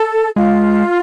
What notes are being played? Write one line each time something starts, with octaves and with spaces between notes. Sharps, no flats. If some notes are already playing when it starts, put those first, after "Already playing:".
Already playing: A4
G#3 F4